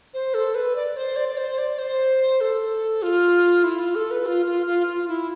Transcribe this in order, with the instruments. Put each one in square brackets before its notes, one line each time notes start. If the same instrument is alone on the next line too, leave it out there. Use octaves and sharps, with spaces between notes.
[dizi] C5
A4
B4
D5
C5
D5
D5
C5
D5
C5
A4
F4
E4
F4
A4
B4
F4
F4
F4
F4
E4